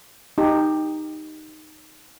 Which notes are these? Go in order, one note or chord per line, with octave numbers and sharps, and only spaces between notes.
D#4 G4